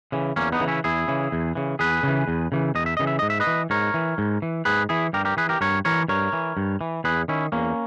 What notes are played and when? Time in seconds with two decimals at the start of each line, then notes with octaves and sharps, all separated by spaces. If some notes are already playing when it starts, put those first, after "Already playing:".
0.12 C#3 E3
0.36 E2 A#3 C#4
0.52 B3 D#4
0.60 C#3 E3
0.68 C#4 E4
0.84 E2 E4 G#4
1.08 C#3 E3
1.32 E2
1.55 C#3 E3
1.79 E2 G#4 B4
2.03 C#3 E3
2.28 E2
2.52 C#3 E3
2.75 E2 D#5
2.86 E5
2.97 C#3 E3 D#5
3.07 E5
3.19 G#2 D#5
3.30 E5
3.40 B4 D#5
3.47 E3
3.70 G#2 A#4 C#5
3.94 E3
4.18 G#2
4.42 E3
4.65 G#2 G#4 B4
4.89 E3 E4 G#4
5.13 G2 G4 A#4
5.25 G4 A#4
5.37 E3 G#4 B4
5.49 G4 A#4
5.61 G2 A#4 C#5
5.85 E3 A#4 C#5
6.08 G2 A#4 C#5
6.33 E3
6.57 G2
6.81 E3
7.04 E2 G#4 B4
7.28 D#3 C#4 E4
7.52 E2 A#3 C#4